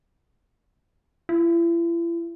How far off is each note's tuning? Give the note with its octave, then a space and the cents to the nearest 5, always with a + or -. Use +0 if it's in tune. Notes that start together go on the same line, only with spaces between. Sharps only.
E4 +40